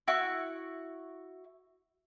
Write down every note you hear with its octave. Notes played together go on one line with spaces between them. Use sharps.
E4 F#4 C#6